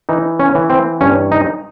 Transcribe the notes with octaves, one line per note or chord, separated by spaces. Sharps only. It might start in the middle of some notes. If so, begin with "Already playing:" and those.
E3 D#4
C#4
E3
C4
G2 C#4
D#4